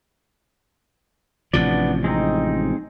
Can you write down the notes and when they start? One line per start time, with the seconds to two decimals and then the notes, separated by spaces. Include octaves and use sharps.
1.53 A1 C3 F3 B3 D4 D5
2.04 G#3 C4 D#4